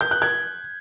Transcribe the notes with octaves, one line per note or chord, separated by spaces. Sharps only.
G6
F#6
G#6